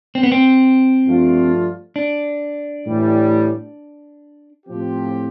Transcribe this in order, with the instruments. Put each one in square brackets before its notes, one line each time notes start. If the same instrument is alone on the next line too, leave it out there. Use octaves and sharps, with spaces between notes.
[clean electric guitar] C4
B3
C4
[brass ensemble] G2 F3 A3 D4 F4
[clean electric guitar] D4
[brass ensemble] A2 E3 G3
A2 F3 C4 G4